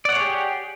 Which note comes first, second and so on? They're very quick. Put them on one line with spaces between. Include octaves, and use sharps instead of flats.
D5 F#5 C#5 G#4 G4